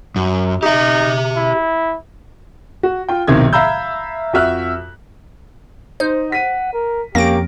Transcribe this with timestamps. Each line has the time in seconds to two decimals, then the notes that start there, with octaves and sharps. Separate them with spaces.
0.16 F#2
0.63 D#4 G4 E5
1.36 E4
2.83 F#4
3.09 F4 G5
3.28 D1 B1 C3 D#3 G#6
3.53 E5 F5 A#5 B5 E6 G6
4.33 F2 F#4 E5 F6 F#6
6.00 D#4 C5
6.32 F#5 B6 D#7
6.73 A#4
7.15 F2 A#3 C#4 G4 A#6 D7